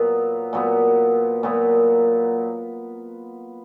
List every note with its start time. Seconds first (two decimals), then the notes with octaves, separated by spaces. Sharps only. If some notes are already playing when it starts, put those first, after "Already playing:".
Already playing: A#2 F#3 B3
0.53 A#2 F#3 B3
1.43 A#2 F#3 B3